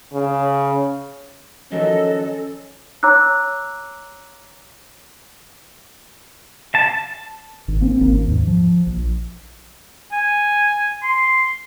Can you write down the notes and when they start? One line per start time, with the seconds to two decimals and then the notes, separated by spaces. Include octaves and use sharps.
0.13 C#3
1.72 D#3 F3 F#3 C#4 A4 D#5
3.03 C#5 A#5 D6 E6 F#6
6.75 A5
7.68 G#1
7.81 A#3 C4 C#4
8.00 D1 G#1 A#3
8.27 D#2 G#2
8.47 F3
8.87 A#1
10.12 G#5
11.03 C6